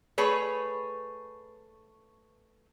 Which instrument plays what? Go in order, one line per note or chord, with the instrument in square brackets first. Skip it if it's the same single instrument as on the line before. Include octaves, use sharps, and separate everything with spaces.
[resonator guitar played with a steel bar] A3 G#4 B4 C#5